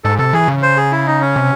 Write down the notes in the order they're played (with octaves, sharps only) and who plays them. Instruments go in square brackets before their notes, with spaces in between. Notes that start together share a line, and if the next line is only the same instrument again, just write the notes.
[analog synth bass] G#2 [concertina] A4
[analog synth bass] C3 [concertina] A4
[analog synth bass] E3 [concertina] G#4
[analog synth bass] C#3
[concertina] C5
G#4
E4
D#4
C#4
[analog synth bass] C3